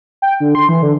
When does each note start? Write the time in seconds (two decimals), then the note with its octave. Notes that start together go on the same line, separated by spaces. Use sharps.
0.22 G5
0.40 D3
0.55 C6
0.69 E3
0.83 D3